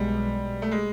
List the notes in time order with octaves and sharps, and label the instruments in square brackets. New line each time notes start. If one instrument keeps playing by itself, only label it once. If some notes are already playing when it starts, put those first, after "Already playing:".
Already playing: [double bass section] B1 B2 G#3 [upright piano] G3
[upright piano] A3
G#3